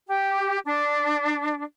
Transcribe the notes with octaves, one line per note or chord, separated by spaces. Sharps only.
G4
D4